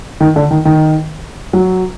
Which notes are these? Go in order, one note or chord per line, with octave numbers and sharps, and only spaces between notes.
D#3
D3
D#3
D#3
F#3